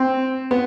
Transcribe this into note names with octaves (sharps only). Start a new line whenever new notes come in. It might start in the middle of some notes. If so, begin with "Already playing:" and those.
Already playing: C4
B3